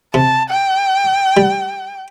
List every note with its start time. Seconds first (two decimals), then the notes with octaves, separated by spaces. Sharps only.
0.14 C3 A5
0.50 G5
1.37 G3